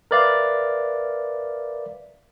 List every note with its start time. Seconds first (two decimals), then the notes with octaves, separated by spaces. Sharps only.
0.11 A#4 B4 D5 E5 F5